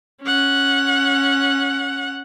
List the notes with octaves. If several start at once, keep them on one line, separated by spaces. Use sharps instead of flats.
C#4 F#5